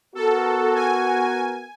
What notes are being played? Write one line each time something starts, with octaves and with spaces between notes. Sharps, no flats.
B3 F#4 A4 A#4
G#5